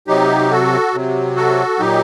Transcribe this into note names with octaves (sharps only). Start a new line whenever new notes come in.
C3 F#3 D#4 G4
F#4 A4
C3 F#3
F#4 A4
A#2 F#3 D#4 G4